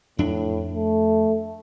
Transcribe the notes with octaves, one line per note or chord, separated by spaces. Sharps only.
F2 A2 D4
A3